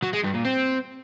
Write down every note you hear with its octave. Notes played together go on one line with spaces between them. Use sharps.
F#3
G#3
G2
A#2
C4